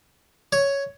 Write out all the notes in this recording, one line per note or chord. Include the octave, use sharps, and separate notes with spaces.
C#5